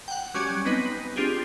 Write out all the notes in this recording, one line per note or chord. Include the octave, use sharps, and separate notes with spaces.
F#5 G5
F#3 G3 C#4 G#5 D7
B3 C4 D#4 B4
C4 D4 F4 G4 G#4